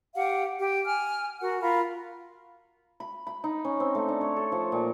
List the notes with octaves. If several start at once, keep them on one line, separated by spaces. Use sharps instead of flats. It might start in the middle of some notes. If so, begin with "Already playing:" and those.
G4 F5 F#5
G4
G#5 F6
F#4 A#4 F#5
F4 A#4 F5 B5
B5
B5
D#4
C#4
C4
A3
D4
C#5
A4
F3
A#2